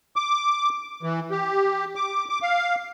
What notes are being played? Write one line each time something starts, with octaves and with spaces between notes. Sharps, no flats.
D6
E3
G4
D6
D6
F5